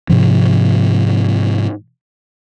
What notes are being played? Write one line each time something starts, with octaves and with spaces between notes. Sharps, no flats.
G#2 C3 F3